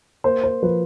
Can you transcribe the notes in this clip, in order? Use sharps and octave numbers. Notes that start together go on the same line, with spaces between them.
A#3 C5
C5
F3 B4